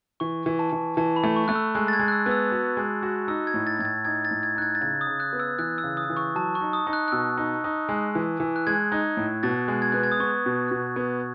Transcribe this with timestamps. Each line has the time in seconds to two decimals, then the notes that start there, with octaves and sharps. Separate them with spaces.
0.20 E3 C#6
0.46 E3
0.59 A5
0.72 E3
0.97 E3 A5
1.16 B5
1.24 A3
1.36 C#6
1.48 A3 F#6
1.55 E6
1.75 G#3 F#6
1.88 A6
1.93 G#6
1.99 G#3
2.08 F#6
2.12 E6
2.26 B3
2.31 E6
2.51 F#4
2.77 G#3
3.03 F#4
3.28 D#4 E6
3.47 G#6
3.54 A2
3.67 A6
3.79 A2 G#6
3.85 A6
4.05 D#4 G#6
4.25 A6
4.31 A2
4.43 G#6
4.56 D#4 F#6
4.62 G#6
4.75 A6
4.81 C#3 G#6
5.01 D#6
5.07 C#3
5.20 F#6
5.33 B3
5.40 E6
5.59 E3 F#6
5.78 E6
5.84 C#3
5.97 D#6
6.10 E3
6.17 C#6
6.35 F#3 A5
6.55 C#6
6.61 D#4
6.73 D#6
6.87 D#4
6.93 F#6
7.08 F#6
7.12 B2 E6
7.37 D#4
7.64 D#4
7.89 G#3
8.15 E3
8.40 E3
8.56 F#6
8.67 G#3 G#6
8.92 D#4
9.17 A2
9.43 B2 A6
9.68 G#3
9.82 G#6
9.92 B3 F#6
10.03 G#6
10.12 D#6
10.20 B3 C#6
10.46 B2
10.71 B2
10.96 B3